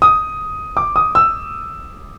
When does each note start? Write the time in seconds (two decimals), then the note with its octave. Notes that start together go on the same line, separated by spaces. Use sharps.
0.02 D#6
0.77 D6
0.96 D#6
1.15 E6